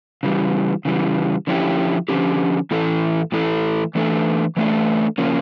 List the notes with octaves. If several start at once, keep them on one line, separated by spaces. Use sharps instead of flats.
C#3 E3 G3
C#3 E3 G3
D3 F3 C#4 E4 G4
D3 F3 C#4 E4 G4
A2 E3 A3 E4 A4
A2 E3 A3 E4 A4
E3 A3 D4 A4
E3 A3 D4 A4
C#3 F3 A#3 C#4